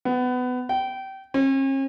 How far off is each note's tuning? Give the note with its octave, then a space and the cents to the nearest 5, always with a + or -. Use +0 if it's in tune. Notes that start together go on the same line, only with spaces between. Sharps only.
B3 +20
G5 -25
C#4 -45